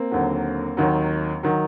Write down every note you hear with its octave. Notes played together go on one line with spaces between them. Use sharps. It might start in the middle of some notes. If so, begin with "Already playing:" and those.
Already playing: A#3 C4
D#2 D3 F#3
D#2 D#3 F#3
D#3 F#3